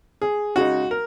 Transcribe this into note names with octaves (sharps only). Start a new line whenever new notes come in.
G#4
C#3 G#3 D#4 F#4
A#4